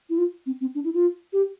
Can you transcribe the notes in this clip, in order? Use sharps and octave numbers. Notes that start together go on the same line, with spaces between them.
E4
F4
C4
C4
D4
E4
F4
G4